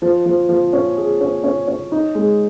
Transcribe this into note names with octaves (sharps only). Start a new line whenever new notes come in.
F3
F3
F3
C#4
G#4
C#4
C#4
C#4
D#4
G#3